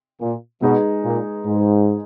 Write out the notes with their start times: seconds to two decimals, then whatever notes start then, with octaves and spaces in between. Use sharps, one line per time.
0.21 A#2
0.62 B2 G#3 D#4 G#4 B4
1.04 A#2
1.46 G#2